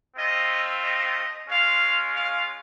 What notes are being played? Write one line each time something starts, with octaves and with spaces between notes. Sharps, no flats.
A3 C4 F4 D#5
D#5
G#3 C#4 F4 F5
F5